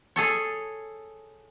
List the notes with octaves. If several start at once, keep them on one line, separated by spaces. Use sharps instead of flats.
G#4 A4 C#5